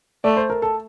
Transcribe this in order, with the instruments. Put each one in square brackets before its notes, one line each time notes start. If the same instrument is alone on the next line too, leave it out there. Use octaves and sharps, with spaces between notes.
[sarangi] A3 [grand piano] D5
[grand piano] C5
A#4
A4